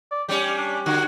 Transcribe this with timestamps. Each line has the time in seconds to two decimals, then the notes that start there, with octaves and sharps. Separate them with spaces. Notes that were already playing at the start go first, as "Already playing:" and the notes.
0.11 D5
0.29 G3 C#4 G4
0.58 D4
0.86 D3 F#4